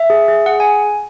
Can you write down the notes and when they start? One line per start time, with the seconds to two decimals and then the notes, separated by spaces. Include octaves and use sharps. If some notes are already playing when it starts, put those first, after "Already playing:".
Already playing: E5
0.10 G#4
0.28 G#4
0.46 G#4 F#5
0.60 G#5